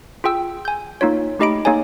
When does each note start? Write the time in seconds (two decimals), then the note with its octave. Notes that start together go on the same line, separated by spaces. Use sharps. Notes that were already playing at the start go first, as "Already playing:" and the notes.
0.24 F4 G#4 G5 E6
0.65 G#5 G6
1.01 A#3 D#4 F4 C#5
1.39 A3 D#4 G4 D#5 B5 D7
1.65 A#3 D#4 G#4 C#5 G#5